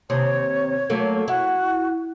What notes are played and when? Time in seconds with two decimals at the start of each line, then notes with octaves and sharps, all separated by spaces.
0.10 D#2 C3 C#5
0.90 F#3 A3 A#3
1.28 E4 F#4